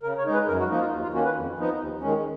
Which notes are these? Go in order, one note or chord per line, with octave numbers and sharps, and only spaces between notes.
C#3 A#4
C#5
G#3 D#4
B4
F#2 A#4
F#4
F3 A#3 D#4
F4
D#2
F4
D#3 A#3 C#4 F#4
B4
F2
F3 B3 D#4
D#2
D#3 G#3 C#4